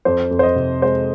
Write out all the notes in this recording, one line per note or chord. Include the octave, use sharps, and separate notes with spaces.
F2 C5
F2
C5
D#5
C3
G#3 C5